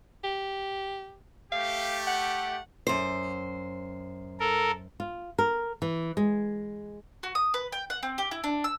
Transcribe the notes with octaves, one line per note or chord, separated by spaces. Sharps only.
G4
A3 G4 F5
F#5
F#2 C5
A4 A#4
F4
A#4
E3
G#3
F#4
D#6
B4
G5
F#5
C4
G4
E4
D4
E6